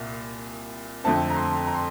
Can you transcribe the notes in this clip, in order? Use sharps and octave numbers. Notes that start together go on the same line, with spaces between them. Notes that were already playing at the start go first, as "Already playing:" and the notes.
Already playing: C2 A#2
F2 D3 A3 C4 A5
A#5
C6
A#5
C6